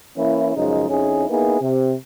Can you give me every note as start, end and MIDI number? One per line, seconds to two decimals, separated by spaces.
0.17 0.56 52
0.17 0.56 58
0.17 0.56 61
0.17 0.56 64
0.56 0.89 42
0.56 0.89 49
0.56 0.89 53
0.56 0.89 56
0.56 0.89 63
0.90 1.26 41
0.90 1.26 61
0.90 1.26 63
0.90 1.26 64
0.90 1.26 68
1.30 1.59 58
1.30 1.59 59
1.30 1.59 63
1.30 1.59 64
1.30 1.59 68
1.61 1.94 48